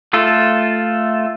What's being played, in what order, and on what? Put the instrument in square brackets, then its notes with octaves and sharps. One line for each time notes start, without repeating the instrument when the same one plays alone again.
[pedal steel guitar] A3 F4 A4